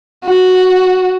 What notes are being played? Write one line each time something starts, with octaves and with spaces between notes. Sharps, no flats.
F#4